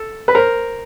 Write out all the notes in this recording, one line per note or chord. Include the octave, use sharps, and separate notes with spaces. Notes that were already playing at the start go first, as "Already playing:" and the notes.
Already playing: A4
B4
A#4 C5